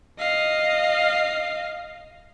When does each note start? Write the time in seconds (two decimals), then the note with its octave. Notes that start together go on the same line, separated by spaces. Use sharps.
0.19 D#5 F5